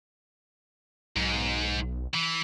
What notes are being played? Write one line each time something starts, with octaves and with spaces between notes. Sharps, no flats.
B1 G#2
E3